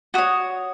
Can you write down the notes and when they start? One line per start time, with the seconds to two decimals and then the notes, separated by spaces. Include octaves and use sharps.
0.14 F#4 C#5 D#6